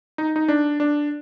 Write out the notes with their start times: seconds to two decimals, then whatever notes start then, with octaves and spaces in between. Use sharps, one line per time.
0.18 D#4
0.36 D#4
0.48 D4
0.80 D4